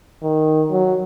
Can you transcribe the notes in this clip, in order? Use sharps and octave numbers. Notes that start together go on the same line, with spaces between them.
D#3
F#3